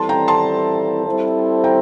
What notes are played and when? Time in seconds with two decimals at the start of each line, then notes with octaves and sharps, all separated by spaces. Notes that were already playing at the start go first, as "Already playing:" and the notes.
Already playing: E3 G3 C4 E4 A4 A5 C6
0.09 G5 A#5
0.28 A5 C6
1.06 G3 C4 E4 A4 C5
1.64 G5 A#5